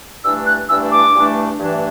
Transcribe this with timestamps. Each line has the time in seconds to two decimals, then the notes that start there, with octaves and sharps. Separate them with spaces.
0.24 G2 E3 A3 D4 E6
0.46 F#6
0.69 G2 E3 A3 D4 E6
0.91 D6
1.14 G2 E3 A3 D4
1.59 G2 E3 A3 D4